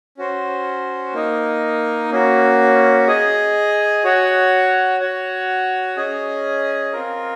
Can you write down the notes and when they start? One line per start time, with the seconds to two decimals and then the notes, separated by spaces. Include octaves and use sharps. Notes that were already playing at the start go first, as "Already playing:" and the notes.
0.17 C#4 F#4 C5
1.13 A#3 D#4 A#4 D#5
2.10 A#3 C#4 F#4
3.07 G#4 D#5 G#5
4.04 F#4 C#5 F#5
4.99 F#4 C#5 F#5
5.97 C#4 G#4 D#5 G#5
6.93 C4 F4 A#4